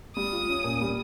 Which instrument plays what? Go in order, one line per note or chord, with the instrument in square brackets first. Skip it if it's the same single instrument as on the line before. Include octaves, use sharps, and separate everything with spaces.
[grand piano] G3 [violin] D#6
[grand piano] F4
C#4
A#2
G3